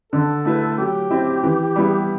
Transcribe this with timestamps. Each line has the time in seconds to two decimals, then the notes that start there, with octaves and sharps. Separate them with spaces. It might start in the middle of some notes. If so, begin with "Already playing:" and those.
0.12 D3 A4
0.45 A3 E4 B4
0.78 F#3 G4
1.11 C4 E4
1.43 E3
1.76 G3 B3 E4